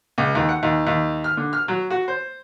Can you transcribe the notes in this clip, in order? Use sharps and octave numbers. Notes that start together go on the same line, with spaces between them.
C#2
D#2
F#5
D#2
D#2
F6
D3
F6
F#3
F#4
C5